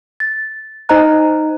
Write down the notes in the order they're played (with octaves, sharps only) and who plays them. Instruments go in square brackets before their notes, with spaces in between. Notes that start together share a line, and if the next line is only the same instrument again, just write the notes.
[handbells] A6
D#4 C5 D#5 A#5 F#6